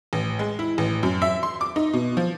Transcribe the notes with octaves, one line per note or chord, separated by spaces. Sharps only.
A1
G#3
E4
A1
F#2
E5
C6
D6
D#4
B2
F3